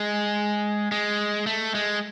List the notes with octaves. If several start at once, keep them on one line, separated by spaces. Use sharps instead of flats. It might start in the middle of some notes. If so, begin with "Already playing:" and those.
Already playing: G#3
G#3
A3
G#3